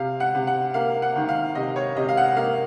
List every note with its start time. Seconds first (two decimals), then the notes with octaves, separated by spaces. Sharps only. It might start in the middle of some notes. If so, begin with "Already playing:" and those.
Already playing: C3 F5
0.20 F#5
0.35 C3
0.47 F#5
0.74 A#3 F5
1.02 F#5
1.16 D#3
1.29 F5
1.55 C3 D#5
1.76 C#5
1.96 C3 D#5
2.09 F5
2.17 F#5
2.36 A#3 F5